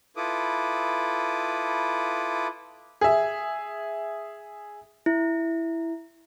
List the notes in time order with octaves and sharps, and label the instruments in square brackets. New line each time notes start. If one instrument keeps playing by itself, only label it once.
[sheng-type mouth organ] E4 F4 A4 B4 D6 D#6
[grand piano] G#4 E5
[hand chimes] E4